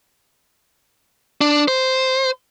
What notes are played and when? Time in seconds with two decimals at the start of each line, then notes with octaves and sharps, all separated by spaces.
1.41 D4
1.68 C5